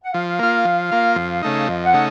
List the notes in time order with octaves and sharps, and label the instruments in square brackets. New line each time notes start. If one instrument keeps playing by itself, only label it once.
[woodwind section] F#5
[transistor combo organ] F3 [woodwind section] F5
[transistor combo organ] A#3 F4
F3
A#3 F4
F2
C#3 A3 D#4
[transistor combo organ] F2 [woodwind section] D#5
[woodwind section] F#5
[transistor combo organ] C#3 A3 D#4